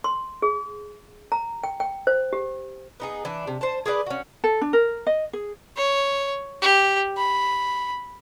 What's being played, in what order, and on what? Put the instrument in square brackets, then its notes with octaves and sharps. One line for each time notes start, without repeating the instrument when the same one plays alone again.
[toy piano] C6
G#4
A#5
G5
G5
C5
G4
[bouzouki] B3 D#4 G#4
E3 D4
C3
C5 A5
G#4 A#4 B4 D5
C#4 F#4
[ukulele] A4
D4
A#4
D#5
G#4
[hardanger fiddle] C#5
G4
B5